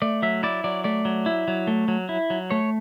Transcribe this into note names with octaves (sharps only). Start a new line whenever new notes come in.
A3 D5
F#3 E5
E4 D5
F#3 D5
A3 D5
F#3
E4
F#3
A3
F#3
E4
F#3
A3 C#5